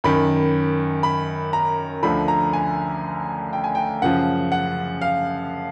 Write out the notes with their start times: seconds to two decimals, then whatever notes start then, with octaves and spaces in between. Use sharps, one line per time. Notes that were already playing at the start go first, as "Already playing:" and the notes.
0.04 F#2 D#3 B5
1.03 B5
1.53 A#5
2.03 D2 D3 F3 B5
2.28 A#5
2.53 G#5
3.53 G5
3.64 G#5
3.75 G5
4.02 F#2 C#3 F3 F#5
4.52 F#5
5.02 F5